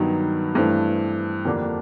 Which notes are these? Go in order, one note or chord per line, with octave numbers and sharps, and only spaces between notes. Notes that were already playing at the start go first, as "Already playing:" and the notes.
Already playing: G2 D#3 F#3 B3 D#4
G2 E3 A3 C4
F2 D3 G3 A#3 D4